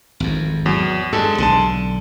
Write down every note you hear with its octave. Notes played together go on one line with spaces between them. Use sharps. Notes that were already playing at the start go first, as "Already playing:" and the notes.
G#1 F2
E2 F#3
G2 G#3 A4
B1 D3 A5 C6